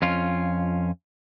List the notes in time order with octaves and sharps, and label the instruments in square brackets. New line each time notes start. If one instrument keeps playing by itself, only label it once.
[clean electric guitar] F2 C#4 F4